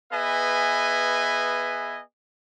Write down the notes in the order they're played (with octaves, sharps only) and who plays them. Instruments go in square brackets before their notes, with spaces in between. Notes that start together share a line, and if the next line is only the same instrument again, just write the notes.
[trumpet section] B3 G#4 B4 D#5 E5 G#5